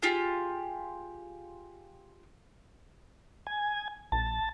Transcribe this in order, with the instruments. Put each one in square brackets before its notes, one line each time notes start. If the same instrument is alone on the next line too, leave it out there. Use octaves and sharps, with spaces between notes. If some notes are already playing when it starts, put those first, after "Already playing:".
[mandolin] F4 G4 G#4
[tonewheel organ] G#5
[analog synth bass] A#1 [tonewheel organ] A5